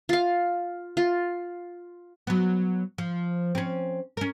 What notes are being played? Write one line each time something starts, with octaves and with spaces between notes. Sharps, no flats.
F4 F5
F4
F#3 B3
F3
C4 C#4
C#4 A#4